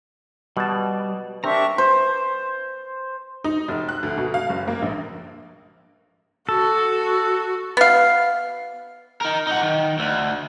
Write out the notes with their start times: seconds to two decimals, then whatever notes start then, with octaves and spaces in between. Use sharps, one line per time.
0.57 B2 G3 A5
1.44 C4 D4 G4 A#4 E5 A#5 C#6
1.78 C5
3.44 D#4
3.68 F1
3.89 F#6
4.03 D2
4.18 B2
4.34 F5
4.49 F#1
4.68 A#3
4.82 A#1
6.49 F#4 A4
7.77 B3 F5
9.21 D#4 A#4
9.47 D#4 F#5
9.63 D#3
9.99 D2